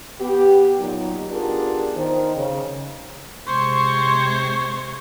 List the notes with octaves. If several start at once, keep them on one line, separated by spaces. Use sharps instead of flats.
B3 G4
A#2 F#3 D#4
B3 D4 F4 G4 G#4 A#4
D#3 C5
C#3
C3 G#3 C5 C#5 C6 C#6